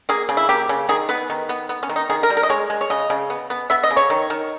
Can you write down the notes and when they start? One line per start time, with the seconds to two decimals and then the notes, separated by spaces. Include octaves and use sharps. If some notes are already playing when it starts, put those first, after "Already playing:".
0.09 A#3 G#4
0.29 C#3
0.37 E4
0.49 A#3 G4
0.69 C#3
0.89 D#3 G#4
1.09 B3 B4
1.30 D#3
1.49 B3
1.69 B3
1.83 C#4
1.89 D#3
1.96 D#4
2.10 D#3 G#4
2.23 A#4
2.30 G3
2.37 A#4
2.43 D#5
2.50 G#3 C#5
2.70 G#3
2.81 C#5
2.90 C#3 D#5
3.10 C#3
3.30 B3
3.50 B3
3.70 B3 E5
3.83 D#5
3.90 C#3
3.96 C#5
4.10 D#3
4.30 D#3